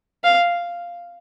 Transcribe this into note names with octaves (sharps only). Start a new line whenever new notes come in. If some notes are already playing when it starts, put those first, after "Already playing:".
F5